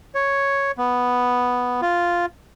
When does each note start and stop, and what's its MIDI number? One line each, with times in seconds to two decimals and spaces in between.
0.15 0.71 73
0.78 1.81 59
1.82 2.26 65